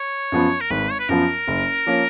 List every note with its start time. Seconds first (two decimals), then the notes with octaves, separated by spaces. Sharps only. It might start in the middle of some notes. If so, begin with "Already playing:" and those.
Already playing: C#5
0.32 F#2 F3 B3
0.61 A#4
0.70 G#1 B4
0.91 C#5
0.99 B4
1.09 F#2 F3 B3 A#4
1.48 F#1
1.87 F3 A#3 C#4